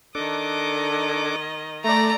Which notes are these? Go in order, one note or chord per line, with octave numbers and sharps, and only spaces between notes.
D#3 D4 A4 D#5 D6
A3 D5 A#5